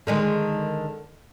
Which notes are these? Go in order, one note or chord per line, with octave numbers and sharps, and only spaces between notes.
D3 D#3 G#3